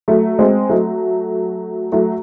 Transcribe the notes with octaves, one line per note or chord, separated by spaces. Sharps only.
F#3 A3
G#3 C4
F#3 A3
F#3 A3